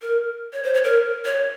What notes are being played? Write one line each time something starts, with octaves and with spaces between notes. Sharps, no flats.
A#4
C#5
C5
C#5
A#4
C#5